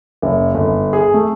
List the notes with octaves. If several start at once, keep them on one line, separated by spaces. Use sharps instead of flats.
F#1
G1
G#4
A3